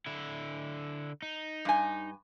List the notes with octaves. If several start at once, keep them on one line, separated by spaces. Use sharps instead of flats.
D3 E4
D#4
G2 G#5